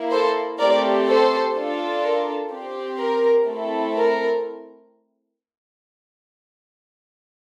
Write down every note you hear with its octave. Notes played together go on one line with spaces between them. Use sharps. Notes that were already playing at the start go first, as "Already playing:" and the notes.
Already playing: A#3 E4
A4 C5
A3 C4 G4 A#4 D5
A4 C5
D4 F4 A4
A#4
C4 G4
A#4
A3 C4 E4 A4
A#4